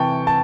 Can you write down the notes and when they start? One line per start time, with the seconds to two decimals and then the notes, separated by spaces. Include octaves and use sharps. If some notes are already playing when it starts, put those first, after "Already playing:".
Already playing: C3 E3 G5 A5 C#6
0.27 A5